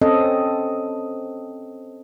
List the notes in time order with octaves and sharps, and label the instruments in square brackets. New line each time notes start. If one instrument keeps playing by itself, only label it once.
[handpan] C4 C#4 A4 D#5